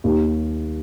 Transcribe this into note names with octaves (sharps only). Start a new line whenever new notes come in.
D#2